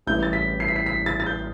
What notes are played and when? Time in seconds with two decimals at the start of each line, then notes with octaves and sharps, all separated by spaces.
0.06 A1 A2 E3 G3 G6
0.23 A6
0.33 B6
0.60 C7
0.68 B6
0.76 C7
0.86 B6
1.06 A6
1.20 A6
1.26 G6